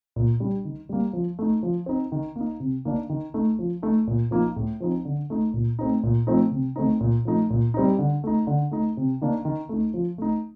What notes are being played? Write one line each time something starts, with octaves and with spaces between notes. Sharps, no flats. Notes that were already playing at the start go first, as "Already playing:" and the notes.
A#2
G3 D4
D#3
G3 A#3
F3
A3 D#4
F3
C4 D#4
D#3
A#3 D#4
C3
D#3 A#3 D4
D#3
A3 D#4
F3
A3 D#4
A#2
F3 A#3 D#4
A2
F3 C4 D#4
D3
A3 D#4
A#2
A3 C4 D#4
A#2
F3 A3 C4 D#4
C3
D#3 A3 C4 D#4
A#2
F3 A3 D#4
A#2
G3 C4 D#4
D3
A3 D#4
D3
A3 D#4
C3
D#3 A#3 D4
D#3
A3 D#4
F3
A3 D#4